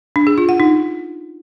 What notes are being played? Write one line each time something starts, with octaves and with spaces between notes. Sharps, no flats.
D4
G#4
F4
F#5
D#4